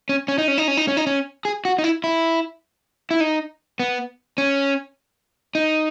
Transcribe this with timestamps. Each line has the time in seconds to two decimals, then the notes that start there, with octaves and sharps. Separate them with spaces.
0.09 C#4
0.28 C#4
0.38 D#4
0.48 C#4
0.58 D#4
0.68 C#4
0.77 D#4
0.88 C#4
0.97 D#4
1.07 C#4
1.45 G#4
1.65 F#4
1.78 D#4
1.84 E4
2.04 E4
3.11 E4
3.20 D#4
3.80 B3
4.38 C#4
5.55 D#4